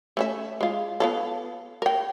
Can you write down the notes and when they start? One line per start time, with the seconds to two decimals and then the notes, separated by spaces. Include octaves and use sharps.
0.17 A3 C#4 E5
0.61 G#3 F4
1.00 B3 F4 A4
1.82 A#4 G5